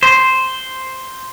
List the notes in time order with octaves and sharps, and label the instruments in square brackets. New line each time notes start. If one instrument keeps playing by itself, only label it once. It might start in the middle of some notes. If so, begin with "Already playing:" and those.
[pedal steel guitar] C5